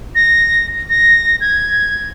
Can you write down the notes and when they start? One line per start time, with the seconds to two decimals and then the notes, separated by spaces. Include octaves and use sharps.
0.15 A#6
0.90 A#6
1.41 G#6